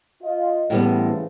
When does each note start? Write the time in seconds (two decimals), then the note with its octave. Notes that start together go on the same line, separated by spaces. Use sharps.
0.23 F4 D#5
0.70 A2 C#3 E3 G3 B3 C5